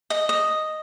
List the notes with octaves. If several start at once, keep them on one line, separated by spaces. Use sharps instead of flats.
D#5
D#5